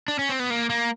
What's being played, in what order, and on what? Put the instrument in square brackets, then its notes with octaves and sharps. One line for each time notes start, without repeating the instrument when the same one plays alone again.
[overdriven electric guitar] D4
C#4
C4
B3
A#3
A#3